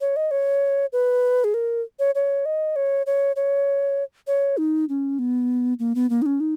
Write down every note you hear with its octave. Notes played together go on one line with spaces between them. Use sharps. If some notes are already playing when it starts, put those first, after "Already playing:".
C#5
D#5
C#5
B4
G#4
A#4
C#5
C#5
D#5
C#5
C#5
C#5
C#5
D#4
C#4
B3
A#3
B3
A#3
D#4
C#4
D#4